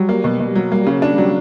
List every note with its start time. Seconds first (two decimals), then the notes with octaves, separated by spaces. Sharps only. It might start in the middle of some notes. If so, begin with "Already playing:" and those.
Already playing: F#3 G3
0.09 A#3
0.24 B2
0.40 B2
0.55 F#3
0.71 G3 A#3
0.86 C#3
0.92 F#3
1.02 D4
1.12 G3
1.18 F#3